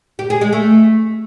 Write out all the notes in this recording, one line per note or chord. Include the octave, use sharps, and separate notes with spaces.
G4
G#4
G#3
A3